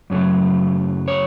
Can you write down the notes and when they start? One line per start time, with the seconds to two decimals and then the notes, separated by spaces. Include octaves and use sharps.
0.10 F#2 C#3 F#3 A3
1.08 C#5